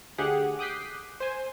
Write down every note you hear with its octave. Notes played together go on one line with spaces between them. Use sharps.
D2 G4 G#4 F#5 F#6
D6 D#6 F#6 G6 B6 C7
C5 G#5